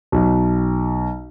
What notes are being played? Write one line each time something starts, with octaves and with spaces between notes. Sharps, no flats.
B1